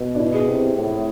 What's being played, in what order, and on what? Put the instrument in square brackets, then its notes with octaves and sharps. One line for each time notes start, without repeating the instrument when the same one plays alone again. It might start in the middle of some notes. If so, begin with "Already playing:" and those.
Already playing: [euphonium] B2
[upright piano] D4
E4
G#4
[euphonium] C3
A2